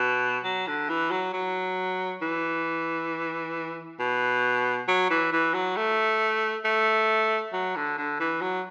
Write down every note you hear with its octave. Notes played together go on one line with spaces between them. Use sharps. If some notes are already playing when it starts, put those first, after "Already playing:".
Already playing: B2
F#3
D3
E3
F#3
F#3
E3
B2
F#3
E3
E3
F#3
A3
A3
F#3
D3
D3
E3
F#3